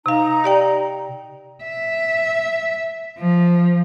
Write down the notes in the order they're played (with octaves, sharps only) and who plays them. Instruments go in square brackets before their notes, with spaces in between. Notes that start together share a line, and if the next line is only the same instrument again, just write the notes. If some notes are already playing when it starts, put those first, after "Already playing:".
[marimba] C3 F5 [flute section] D#4 A#5
[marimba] G4 D5 G5
[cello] E5
F3